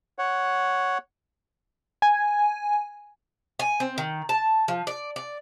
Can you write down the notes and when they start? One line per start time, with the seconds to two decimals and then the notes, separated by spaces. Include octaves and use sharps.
0.19 C#5 F#5
2.02 G#5
3.59 G#5
3.80 C4
3.98 D#3
4.29 A5
4.68 F3
4.87 D5
5.16 D5